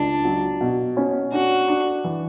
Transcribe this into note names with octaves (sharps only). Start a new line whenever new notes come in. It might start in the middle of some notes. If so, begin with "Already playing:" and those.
Already playing: C#2 D4
F#3
B2
C#4
D4 F#4
D4
E3